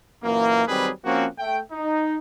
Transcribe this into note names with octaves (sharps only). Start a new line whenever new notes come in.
F#2 A#2 E3 A#3
D#3 F#3 G3 C4 G#4 B4
F3 A#3 C4 C#4 F#4
A3 G5
D#4